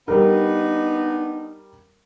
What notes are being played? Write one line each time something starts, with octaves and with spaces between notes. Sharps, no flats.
G3 B3 D4 D#4 A#4